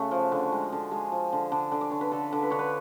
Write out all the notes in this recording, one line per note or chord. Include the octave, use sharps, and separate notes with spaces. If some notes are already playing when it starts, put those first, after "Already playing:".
Already playing: C#3 A3 F#4
F3
D3
G#3
D3
G#3 G#4
F3
D3
D3
D3
D5
D3 C#5
B4
D3 A4
D3
B4
D3 C#5
B4